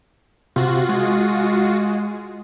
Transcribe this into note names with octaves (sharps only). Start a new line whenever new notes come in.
C3 F4 F#4
G#3